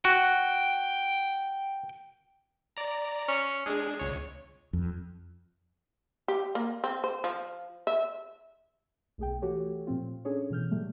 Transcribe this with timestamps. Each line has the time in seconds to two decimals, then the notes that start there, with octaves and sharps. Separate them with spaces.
0.05 F#4 G5
2.77 D5 A#5
3.28 C#4
3.66 G#3 D4 G#4
3.99 C#2 C#5
4.73 F2
6.28 G4
6.55 A#3
6.84 C4
7.04 C5
7.24 F3
7.87 E5
9.18 B1 A3 G#4 G5
9.42 E3 A3 F#4 G4 A4 C#5
9.87 A#2 F3 C4 F4
10.25 C#4 D4 G#4 A4 C#5
10.50 B2 E3 F6 G6
10.71 A#2 F#3 G3 A3